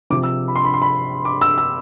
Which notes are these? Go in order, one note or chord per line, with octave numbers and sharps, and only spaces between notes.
C3 F3 D6
E6
B5
C6
B5
C6
B5
D6
E6
E6